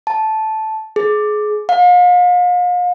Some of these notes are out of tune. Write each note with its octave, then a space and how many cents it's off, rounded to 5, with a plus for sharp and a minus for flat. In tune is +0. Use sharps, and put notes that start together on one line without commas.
A5 -10
G#4 +25
F5 +40